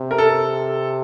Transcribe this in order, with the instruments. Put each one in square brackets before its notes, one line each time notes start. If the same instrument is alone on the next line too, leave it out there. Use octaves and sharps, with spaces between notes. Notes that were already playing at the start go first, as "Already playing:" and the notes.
Already playing: [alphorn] C3
[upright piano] A#4
A4